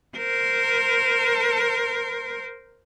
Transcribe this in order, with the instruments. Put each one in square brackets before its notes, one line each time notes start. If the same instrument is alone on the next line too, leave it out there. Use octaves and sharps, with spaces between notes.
[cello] A#4 C5